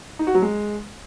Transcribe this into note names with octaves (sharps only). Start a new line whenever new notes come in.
D#4
F#4
F#3
G#3